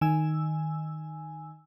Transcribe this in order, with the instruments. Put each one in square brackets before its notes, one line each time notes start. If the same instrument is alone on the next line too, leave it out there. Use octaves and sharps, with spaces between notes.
[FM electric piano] D#3 G#5 E6